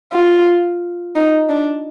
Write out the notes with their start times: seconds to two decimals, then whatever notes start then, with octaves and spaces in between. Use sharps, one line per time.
0.13 F4
1.16 D#4
1.50 D4